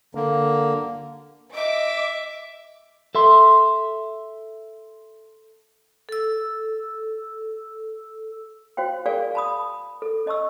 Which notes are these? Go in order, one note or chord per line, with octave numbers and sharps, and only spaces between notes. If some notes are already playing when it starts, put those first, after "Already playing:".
D3 A#3
D#5 E5 D6
A4 E5 C6
A4 E6
F#4 C5 F5 G5
G#4 A#4 D5 F5 G5 G#5
A5 B5 D#6
A4
C#4 D#5 A5 C#6 E6